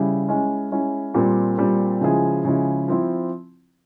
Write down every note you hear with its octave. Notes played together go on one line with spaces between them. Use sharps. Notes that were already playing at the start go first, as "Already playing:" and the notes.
Already playing: C#3 G3 E4
G#3 C#4 E4
G#3 C#4 E4
A#2 G3 C4
A#2 G3 C4
C#3 F3 G#3 E4 G#4
C#3 F3 G#3 E4 G#4
F3 C4 E4